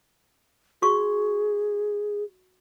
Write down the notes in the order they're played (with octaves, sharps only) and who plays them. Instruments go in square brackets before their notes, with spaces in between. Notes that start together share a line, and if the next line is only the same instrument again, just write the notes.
[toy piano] F#4 C#6 [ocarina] G#4